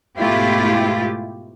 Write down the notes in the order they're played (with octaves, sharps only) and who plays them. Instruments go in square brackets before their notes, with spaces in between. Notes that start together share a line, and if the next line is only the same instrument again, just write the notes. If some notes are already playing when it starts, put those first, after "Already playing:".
[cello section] G#2 B2 A3 E4 F4 G4